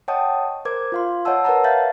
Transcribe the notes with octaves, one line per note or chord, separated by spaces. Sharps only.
C#5 D#5 F#5 G5 A5 D#6
A#4 C5 D6 G#6
F4 F5 C6
C#5 D#5 F#5 A5 E6
A#4 B4 C#5 F#5 A5 A#5
E5 F5 G6 A6